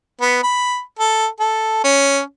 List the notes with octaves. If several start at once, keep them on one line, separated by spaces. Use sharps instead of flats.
B3
B5
A4
A4
C#4